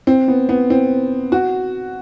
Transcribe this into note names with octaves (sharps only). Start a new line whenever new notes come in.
C4
B3
B3
C4
F#4